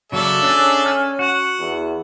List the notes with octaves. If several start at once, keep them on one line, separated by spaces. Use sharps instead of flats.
C#3 F#3 A#3 A4 D5 E5
C#4 D4 G#4
G#5 F6
F#4 F#5
E2